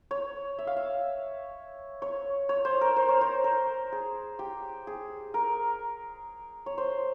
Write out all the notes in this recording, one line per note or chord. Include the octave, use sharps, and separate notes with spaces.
C#5
E5
F5
E5
C#5
C#5
C5
A#4
C5
C#5
C5
A#4
G#4
G4
G#4
A#4
C#5
C5